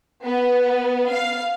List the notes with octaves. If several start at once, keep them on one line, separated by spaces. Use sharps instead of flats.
B3
F5